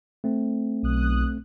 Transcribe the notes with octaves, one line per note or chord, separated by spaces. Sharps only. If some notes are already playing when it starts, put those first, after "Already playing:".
A3 C4
B1 D#6 F#6